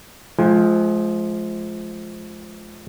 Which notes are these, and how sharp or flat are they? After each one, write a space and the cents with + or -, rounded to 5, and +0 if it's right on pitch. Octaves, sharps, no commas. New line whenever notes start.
F3 +0 G#3 +35 G#5 -35